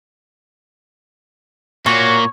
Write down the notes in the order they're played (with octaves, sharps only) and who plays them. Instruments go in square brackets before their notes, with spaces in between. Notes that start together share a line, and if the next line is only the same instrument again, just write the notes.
[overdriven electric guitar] A#2 A#3 [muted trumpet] F#4 [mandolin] C#5